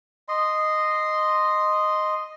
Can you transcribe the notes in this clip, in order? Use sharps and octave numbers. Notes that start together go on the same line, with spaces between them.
D#5 C6